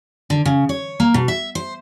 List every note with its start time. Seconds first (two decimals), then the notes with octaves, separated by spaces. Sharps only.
0.30 D3
0.45 C#3
0.69 C#5
1.00 A#3
1.14 B2
1.28 E5
1.55 C5